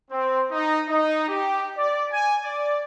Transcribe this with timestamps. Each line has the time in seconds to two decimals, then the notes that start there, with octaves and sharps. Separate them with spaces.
0.11 C4
0.50 D#4
0.88 D#4
1.28 G4
1.76 D5
2.12 G#5
2.43 D5